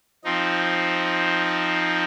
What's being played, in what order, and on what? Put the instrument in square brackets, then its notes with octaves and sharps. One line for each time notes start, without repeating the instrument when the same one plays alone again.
[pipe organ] F3 C4 D#4